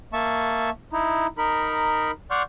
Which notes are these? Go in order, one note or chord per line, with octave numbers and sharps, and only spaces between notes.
A#3 E5 A5 C#6
D#4 E4
D#4 A#4 B5
D5 F#5 C6 C#6 F6 G6